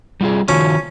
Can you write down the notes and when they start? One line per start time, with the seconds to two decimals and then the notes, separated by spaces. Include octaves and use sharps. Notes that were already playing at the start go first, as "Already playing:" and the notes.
0.21 G3 F4 G#4
0.49 D#3 C#4 F4 F#4